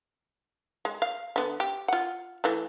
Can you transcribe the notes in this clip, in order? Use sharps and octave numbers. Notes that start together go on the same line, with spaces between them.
G#3
F5
D3 B3
G4
F4 F#5
E3 A3